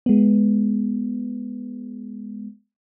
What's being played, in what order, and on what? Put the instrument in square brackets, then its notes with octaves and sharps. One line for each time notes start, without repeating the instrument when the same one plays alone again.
[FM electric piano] G#3 B3